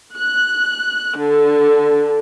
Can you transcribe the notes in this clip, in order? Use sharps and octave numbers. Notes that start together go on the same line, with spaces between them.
F#6
D3